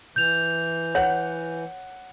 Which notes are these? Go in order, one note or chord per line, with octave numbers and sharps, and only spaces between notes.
E3 G6 F7
C#5 F#5